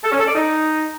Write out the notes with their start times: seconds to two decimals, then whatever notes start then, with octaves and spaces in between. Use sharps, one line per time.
0.04 A4
0.12 C#4
0.20 A4
0.27 D5
0.35 D#4